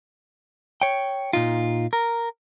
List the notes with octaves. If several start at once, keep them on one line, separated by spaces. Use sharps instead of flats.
C#5 G5
A#2 D#4 F4
A#4